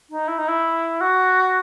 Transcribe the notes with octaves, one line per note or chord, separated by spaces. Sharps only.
D#4
E4
D#4
E4
F#4